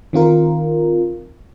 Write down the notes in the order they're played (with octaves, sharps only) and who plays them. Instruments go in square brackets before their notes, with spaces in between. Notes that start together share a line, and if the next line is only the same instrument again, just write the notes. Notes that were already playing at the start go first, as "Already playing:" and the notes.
[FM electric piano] D#3 C4 F4 A#4